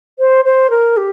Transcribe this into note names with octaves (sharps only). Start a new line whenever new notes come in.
C5
C5
A#4
G4